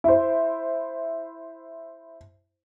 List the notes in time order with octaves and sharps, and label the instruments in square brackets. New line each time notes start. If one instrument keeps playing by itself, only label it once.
[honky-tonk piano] E4 C5